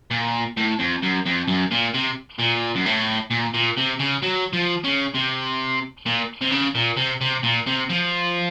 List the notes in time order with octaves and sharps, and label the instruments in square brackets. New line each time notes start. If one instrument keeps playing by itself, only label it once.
[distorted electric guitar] A#2
A2
F2
F#2
F2
F#2
A#2
C3
A#2
F#2
A2
A#2
A#2
C3
C#3
F#3
F3
C#3
C3
A#2
C3
C#3
A#2
C3
C3
A#2
C3
F3